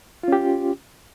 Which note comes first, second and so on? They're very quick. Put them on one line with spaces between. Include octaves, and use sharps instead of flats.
F4 C#4 G4